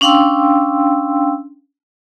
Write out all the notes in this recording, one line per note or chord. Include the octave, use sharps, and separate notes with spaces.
C#4 D4 F5 G5 C6 E6